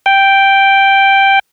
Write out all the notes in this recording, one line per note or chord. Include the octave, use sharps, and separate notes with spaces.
G5